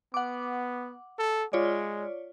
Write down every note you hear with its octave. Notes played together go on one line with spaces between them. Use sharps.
B3 F#5 D6
A4
G#3 F4 C#5 D5